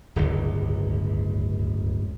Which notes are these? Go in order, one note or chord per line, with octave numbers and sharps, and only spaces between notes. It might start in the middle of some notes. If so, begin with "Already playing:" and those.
D1 G1 C#2